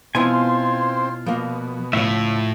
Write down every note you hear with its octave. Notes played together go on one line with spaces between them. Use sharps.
B2 B3 C4 E4 F4 C5 G#5
B2 F3 A#3
C#2 A2 F3 C#5 E5